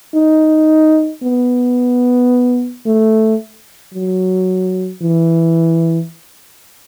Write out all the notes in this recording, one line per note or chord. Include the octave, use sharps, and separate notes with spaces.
D#4
B3
A3
F#3
E3